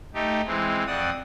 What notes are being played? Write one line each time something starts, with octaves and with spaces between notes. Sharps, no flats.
A3 D#4 G4
E3 G#3 C4
F2 C4 D5 F#5 D#6